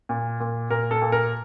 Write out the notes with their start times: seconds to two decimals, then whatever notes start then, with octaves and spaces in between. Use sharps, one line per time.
0.09 A#2
0.40 A#2
0.71 A#2 A#4
0.91 A4
1.02 A#2
1.12 A#4